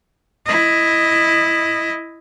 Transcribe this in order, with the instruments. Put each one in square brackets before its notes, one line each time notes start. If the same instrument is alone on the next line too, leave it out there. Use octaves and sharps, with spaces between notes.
[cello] E4 D#5